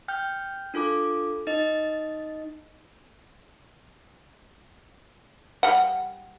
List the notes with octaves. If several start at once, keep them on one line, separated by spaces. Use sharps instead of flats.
G5 F6 G6
D4 F4 A4 D6
D#4 D#5
G3 F#5